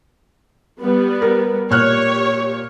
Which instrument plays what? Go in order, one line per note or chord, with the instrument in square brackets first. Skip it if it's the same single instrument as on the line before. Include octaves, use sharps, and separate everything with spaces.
[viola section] G3 B3
[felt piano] A#4
[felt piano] A#2 F6 F#6 [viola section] G4 C#5